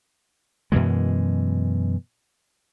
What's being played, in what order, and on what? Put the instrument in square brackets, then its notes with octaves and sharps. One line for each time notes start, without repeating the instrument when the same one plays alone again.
[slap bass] F#2 B2 E3 G#3